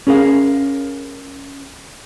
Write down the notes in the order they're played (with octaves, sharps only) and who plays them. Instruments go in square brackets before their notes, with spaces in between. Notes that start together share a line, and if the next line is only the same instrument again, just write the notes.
[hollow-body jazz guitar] C#4 G#4 A#4 F5